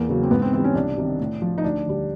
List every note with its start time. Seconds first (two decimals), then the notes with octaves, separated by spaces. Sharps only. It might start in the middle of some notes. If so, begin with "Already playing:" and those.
Already playing: E2 A#3
0.09 C#3 F#3
0.23 C4
0.31 G#2 B3
0.42 C4
0.53 E3 C4
0.57 G3
0.64 C#4
0.75 C2 D4
0.97 C3 D#3
1.20 A2
1.42 F3
1.58 D#4
1.64 D2 D4
1.87 D3 G3